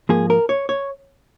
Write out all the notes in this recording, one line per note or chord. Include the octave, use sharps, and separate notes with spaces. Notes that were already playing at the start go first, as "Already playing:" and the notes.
G#2 F3 A#3 G#4
A#4
C#5
C#5